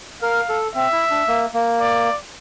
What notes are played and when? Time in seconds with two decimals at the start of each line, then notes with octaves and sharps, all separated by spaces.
0.22 A#4 F5
0.49 A4
0.75 C4 E5
0.92 E4
1.11 D4
1.28 A#3
1.54 A#3
1.80 D5